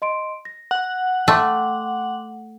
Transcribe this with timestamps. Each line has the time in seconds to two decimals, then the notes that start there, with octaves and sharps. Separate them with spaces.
0.02 D#5 C6 D7
0.45 A#6
0.71 F#5
1.28 A3 G5 C6 D6